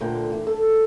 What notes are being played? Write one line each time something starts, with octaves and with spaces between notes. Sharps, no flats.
D2 A#2 D3 G5
E3
A4